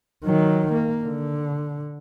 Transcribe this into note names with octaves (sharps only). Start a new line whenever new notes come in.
D#3 F#3
A#3
D3